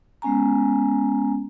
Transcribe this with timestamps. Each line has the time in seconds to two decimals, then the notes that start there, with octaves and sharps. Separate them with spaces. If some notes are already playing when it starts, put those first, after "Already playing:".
0.22 G#3 B3 C#4 G#5 A#5